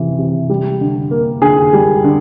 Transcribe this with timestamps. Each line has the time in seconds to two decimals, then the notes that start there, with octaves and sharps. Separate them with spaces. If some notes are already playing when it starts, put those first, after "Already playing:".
Already playing: C3 E3
0.18 C3
0.49 G3
0.81 D3
1.11 A#3
1.42 D3 G#4
1.73 G3
2.04 D3